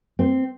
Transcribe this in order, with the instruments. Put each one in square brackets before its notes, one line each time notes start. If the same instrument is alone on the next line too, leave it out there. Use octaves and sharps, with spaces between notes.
[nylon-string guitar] C4